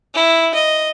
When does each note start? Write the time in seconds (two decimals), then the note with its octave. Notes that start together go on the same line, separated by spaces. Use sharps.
0.14 E4
0.54 D#5